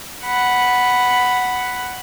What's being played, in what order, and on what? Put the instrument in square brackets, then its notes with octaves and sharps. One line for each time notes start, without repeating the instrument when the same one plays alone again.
[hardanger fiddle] F#5 B5